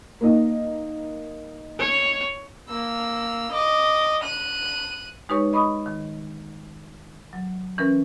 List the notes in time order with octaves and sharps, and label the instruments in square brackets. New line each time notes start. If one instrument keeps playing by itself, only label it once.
[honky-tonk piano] A#3 D#4
[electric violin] C#5
[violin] A#3 E6
D#5 D6
F#6 D#7
[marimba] G#3 D#4 G4 B4 C#5 C#6
D#5 B5 C#6 D#6
D#3
F#3
E3 C#4 A#4 B4